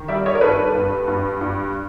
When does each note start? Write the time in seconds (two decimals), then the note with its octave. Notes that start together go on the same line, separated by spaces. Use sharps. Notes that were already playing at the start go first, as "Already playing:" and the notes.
Already playing: D#3
0.08 G3 D5 E5
0.26 C#5 D#5
0.35 A#4
0.41 G2 A4 B4
0.74 G2
1.08 G2
1.41 G2